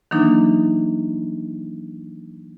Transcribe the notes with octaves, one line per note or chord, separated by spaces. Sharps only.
D#3 E3 F#3 A#3 D4 D#4